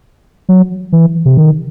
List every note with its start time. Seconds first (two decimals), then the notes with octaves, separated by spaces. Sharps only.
0.49 F#3
0.92 E3
1.25 C3
1.37 D#3